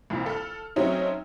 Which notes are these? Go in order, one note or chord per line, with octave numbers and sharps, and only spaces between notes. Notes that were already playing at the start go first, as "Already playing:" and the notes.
C2 F2 A#2 F3
A4 F6
F#3 A3 C4 C#4 D#4 F#4